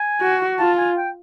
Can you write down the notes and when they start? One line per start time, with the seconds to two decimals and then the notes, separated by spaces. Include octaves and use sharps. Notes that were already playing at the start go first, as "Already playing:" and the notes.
Already playing: G#5
0.21 F#4
0.59 F4 A5
0.78 G#5
0.97 G5